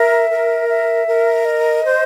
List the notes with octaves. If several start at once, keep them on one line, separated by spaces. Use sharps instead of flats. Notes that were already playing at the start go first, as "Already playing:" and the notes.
Already playing: A#4 E5
A#4
E5
A#4
D#5
C5